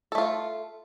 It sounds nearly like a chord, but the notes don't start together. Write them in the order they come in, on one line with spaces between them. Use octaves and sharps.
A4 A3 F4